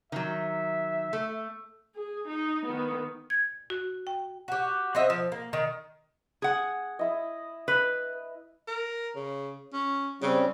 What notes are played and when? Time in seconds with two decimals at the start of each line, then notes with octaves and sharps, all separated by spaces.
0.12 D#3 F#3 E5
1.13 A3
1.95 G#4
2.28 D#4
2.66 D#3 B3
3.30 G#6
3.70 F#4
4.07 G5
4.48 F#4 G4
4.95 C4 F#4 D#5 E5
5.10 F3
5.32 A#3
5.53 D#3
6.42 G#4 F#5
6.99 E4 D#5
7.68 B4
8.67 A#4
9.15 C#3
9.73 C#4
10.22 C#3 G3 C4 C#4